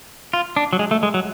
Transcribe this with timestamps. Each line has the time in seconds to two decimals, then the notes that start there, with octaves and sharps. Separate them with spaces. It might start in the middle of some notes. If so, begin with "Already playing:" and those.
0.33 F4
0.56 D4
0.73 F#3
0.79 G#3
0.91 A3
1.03 G#3
1.14 F#3